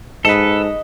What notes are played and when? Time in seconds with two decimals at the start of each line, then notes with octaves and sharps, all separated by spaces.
0.25 G#2 A4 B4 D#5